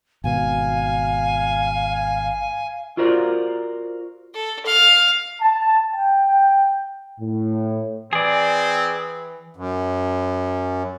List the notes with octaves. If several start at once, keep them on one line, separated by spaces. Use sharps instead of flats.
G#1 B2 B3 F5 G#5
F4 F#4 A#4 C5 D5
A4
F5
A5
G5
A2
E3 C4 G#4 D5
F#2